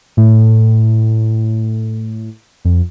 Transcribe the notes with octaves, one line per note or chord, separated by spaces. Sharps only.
A2
F2